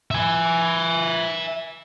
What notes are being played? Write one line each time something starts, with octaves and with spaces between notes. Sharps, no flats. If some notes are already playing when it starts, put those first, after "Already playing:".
E5 G#5